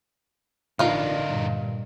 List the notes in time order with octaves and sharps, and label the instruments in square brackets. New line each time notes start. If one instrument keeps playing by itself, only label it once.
[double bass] A1 D4 [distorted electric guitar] D3 A#4 [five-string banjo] D#4 F4 F5
[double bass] G2 A#2